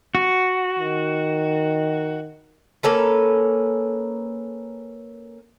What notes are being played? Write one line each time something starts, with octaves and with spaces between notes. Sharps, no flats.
F#4
D#3
A#3 C#4 A4 B4